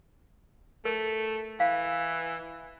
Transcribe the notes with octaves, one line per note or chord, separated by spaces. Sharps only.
A3 A#4
E3 F5